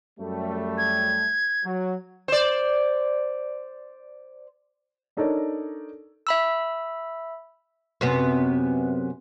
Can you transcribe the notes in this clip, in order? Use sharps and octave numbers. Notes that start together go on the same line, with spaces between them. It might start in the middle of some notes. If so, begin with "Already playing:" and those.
F#2 G3 A3
G#6
F#3
C5 D5
D4 D#4 A4 A#4 C#5 D5
E5 B5 E6
F#2 C3 B3